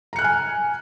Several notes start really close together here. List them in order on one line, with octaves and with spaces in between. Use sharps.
A#5 C#7 F#6 F6 G#5